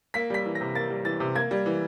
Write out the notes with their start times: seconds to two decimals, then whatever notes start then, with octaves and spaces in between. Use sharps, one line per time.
0.14 A#3 B6
0.30 G3 B6
0.45 E3
0.55 A#6
0.61 C3
0.75 A#3 A6
0.90 G3
1.05 E3 A6
1.20 C3
1.35 A#3 G#6
1.51 G3
1.66 E3